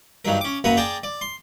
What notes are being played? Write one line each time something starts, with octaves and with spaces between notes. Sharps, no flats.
G2 D#3 F#3 A#4
C#4 D6
F#2 A#3 F#4 B4 A#5
G#4 D5 G5 A5 A#5
D5
C6